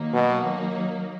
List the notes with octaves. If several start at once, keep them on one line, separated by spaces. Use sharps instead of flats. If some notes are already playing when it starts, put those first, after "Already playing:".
Already playing: D#3 F#3 A#3 D#4
B2